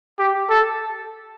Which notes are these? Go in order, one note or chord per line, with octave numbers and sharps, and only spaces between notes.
G4
A4